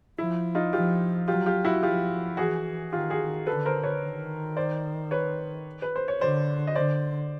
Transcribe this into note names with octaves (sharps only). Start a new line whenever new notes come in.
F3 E4
D#4 F4
F3 F4 G4
F#3 F4 G4
F4 G4
E4 F#4
F3 F4 G4
E3 F#4 G#4
D#3 F4 G4
F#4 G#4
D3 A4 B4
A#4 C5
B4 C#5
D#3
C5 D5
B4 C#5
B4
C5
C#5
D3 C5 D5
D#5
D3 C5 D5